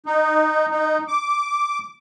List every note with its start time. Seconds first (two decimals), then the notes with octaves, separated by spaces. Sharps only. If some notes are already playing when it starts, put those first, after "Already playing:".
0.06 D#4
0.70 D#4
1.08 D6